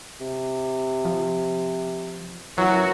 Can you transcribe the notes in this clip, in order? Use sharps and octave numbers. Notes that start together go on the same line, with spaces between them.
C3
F3
E3 F#3 C#4 F#4 A#4